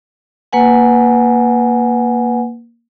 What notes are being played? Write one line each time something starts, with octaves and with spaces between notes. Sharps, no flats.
A#3 B4 F#5 G#5